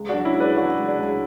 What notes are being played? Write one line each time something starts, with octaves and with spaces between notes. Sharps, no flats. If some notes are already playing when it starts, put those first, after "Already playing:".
Already playing: C#2
D4 F#4
F#3
C#4 E4
C#2 B4 D5
F#3 D4 F#4
C#2
D4
C#2